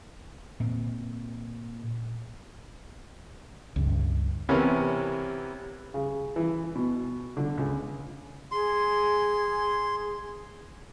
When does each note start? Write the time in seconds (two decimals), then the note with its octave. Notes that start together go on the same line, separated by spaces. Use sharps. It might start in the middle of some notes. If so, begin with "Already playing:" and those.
0.60 A#2 C4
3.76 C#2 G2
4.49 C3 E3 B3 C#4 A#4
5.94 C#3
6.36 E3
6.75 B2
7.37 D3
7.58 C#2
8.52 G#4 C6